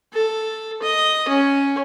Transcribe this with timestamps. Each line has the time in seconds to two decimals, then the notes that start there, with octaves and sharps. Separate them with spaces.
0.13 A4
0.83 D#5
1.28 C#4